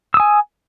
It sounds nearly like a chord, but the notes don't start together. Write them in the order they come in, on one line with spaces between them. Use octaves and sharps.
E6 D#6 G#5